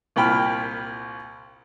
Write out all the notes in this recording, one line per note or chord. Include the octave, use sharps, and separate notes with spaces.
C2 A#2 G5 B5 F6